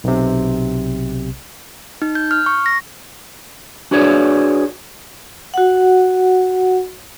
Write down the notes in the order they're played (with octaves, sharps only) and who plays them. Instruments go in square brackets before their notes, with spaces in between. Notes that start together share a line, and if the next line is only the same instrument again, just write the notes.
[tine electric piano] B1 C3
[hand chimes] D#4
G6
F6
C#6
A#6
[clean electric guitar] D4 F#4 G#4 B4 C#5 D5
[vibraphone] F#4 F#5